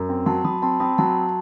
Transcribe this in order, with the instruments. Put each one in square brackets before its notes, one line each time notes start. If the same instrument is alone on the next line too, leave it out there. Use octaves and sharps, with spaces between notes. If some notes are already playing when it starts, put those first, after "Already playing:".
Already playing: [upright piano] F#2
C4
[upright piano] F#3 [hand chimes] A5 C6
[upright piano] F#3 [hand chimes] B5 D#6
[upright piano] C4 [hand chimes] A5 C6
[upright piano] C4 [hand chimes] B5 D#6
[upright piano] F#3 [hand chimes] A5 C6